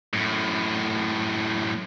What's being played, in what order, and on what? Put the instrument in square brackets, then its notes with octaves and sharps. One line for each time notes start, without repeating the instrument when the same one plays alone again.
[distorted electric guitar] F#2 A2